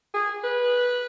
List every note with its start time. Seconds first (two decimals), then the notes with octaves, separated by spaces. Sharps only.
0.14 G#4
0.44 B4